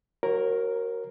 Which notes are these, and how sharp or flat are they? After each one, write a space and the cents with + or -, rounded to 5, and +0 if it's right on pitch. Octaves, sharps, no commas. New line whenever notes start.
F#4 +15 A#4 +0 C#5 -35